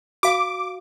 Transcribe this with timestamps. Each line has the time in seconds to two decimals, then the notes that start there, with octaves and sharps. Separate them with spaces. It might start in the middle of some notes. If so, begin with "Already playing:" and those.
0.23 F#4 F5 D6